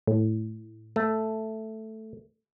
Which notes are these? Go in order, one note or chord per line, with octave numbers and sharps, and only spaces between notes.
A2
A3